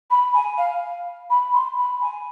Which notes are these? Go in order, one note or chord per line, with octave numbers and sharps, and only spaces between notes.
B5
G#5
F5
B5
C6
B5
G#5